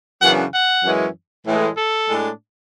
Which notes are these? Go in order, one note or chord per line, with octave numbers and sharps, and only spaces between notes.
F#2 C#3 E3 B3 D4 F#5
F#5
F#2 E3 G#3 C#4
A2 E3 G#3
A4
A2 G#3 D4